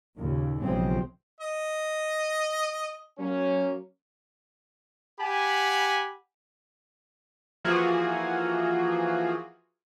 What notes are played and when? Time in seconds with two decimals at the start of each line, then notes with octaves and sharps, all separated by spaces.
0.18 D#2 A#2 C#3
0.62 B1 C#3 F3 G3 G#3 C4
1.40 D#5
3.18 F#3 A#3 C#4
5.20 G4 F#5 G#5 B5
7.65 E3 F3 A#3 F4 F#4 G#4